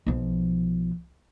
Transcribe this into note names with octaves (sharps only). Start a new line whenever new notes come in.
B1 F3